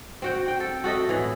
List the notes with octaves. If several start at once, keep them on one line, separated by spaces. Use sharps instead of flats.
C4 F#4 G5
G5
A4
F#4 A4 D#5 E5
A2 E3